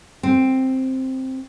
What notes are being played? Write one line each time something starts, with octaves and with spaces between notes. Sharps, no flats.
C4